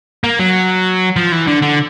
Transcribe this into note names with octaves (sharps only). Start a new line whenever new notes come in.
A#3
F#3
F3
E3
D3
D3